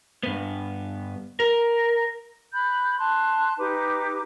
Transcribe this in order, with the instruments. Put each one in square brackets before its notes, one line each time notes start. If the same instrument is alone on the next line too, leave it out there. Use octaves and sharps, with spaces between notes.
[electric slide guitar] G2 B3
A#4
[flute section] B5 F#6 G6
A5 C6 F#6
D#4 G4 B4 D6